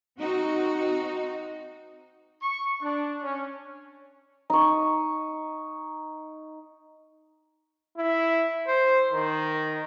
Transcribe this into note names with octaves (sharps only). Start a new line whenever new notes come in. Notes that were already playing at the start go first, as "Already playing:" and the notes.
C4 D#4 F#4
C#6
D4
C#4
D#4 C#6
E4
C5
D#3